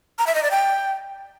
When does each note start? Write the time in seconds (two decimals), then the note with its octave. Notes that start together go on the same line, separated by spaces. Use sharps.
0.19 A#5
0.27 E5
0.35 D#5
0.43 D5
0.51 G5